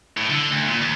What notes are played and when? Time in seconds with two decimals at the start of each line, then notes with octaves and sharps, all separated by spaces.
0.17 A2
0.29 D3
0.50 D2
0.67 A#2
0.81 D#2